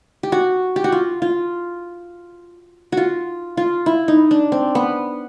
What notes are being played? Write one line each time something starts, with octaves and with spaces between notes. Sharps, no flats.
G4
F#4
G4
F#4
F4
F4
F4 F#4
F4
E4
D#4
D4
C4
B3